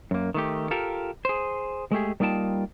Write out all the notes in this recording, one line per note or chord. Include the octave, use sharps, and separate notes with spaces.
F#2 A#3
D#3 A3 G4
F4 G4 A4 A#4
G#4 C5
G#3 A3 G4 G#4
G3 A#3 D#4 F4 G5 A5